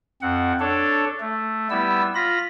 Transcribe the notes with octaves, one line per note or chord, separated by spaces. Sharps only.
F2 C4 F#5
D4 A4 C#5
A3
G3 B3 E4 E6
F4 B5 A#6